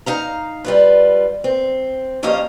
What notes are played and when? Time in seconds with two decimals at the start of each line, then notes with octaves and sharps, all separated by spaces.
0.06 D#4 F5 A#5
0.64 G3 F4 B4
1.44 C4
2.23 F2 A#3 C#4 G4 D#5 F5